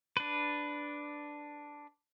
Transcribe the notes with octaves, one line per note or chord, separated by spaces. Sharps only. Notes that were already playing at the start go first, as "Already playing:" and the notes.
D4 B4